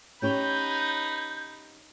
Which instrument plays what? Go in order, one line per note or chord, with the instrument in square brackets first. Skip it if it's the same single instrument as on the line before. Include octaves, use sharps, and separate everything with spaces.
[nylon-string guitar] C#4 G4 C#5 [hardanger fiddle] D#4 B4 [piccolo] G6